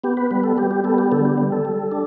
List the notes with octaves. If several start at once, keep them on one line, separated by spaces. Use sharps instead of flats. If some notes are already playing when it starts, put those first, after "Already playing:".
B3 G4
B4
G3 B4
A4
G3 G4
G4
B3 A4
G4
D3 A4
G4
G3
A4
G3
D4